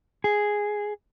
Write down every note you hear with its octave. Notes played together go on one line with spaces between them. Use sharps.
G#4